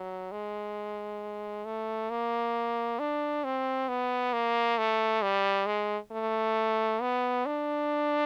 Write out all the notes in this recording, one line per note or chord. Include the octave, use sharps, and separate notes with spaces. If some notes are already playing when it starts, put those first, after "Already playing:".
Already playing: F#3
G#3
A3
A#3
D4
C4
B3
A#3
A3
G3
G#3
A3
B3
D4